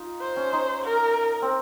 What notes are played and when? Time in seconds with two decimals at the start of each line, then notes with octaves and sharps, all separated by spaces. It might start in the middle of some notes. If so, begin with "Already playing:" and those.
Already playing: D#4 F4
0.21 C5
0.36 C#4
0.53 D#4
0.84 A#4
1.42 C4